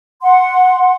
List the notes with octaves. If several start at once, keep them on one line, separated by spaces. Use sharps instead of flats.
F#5 C6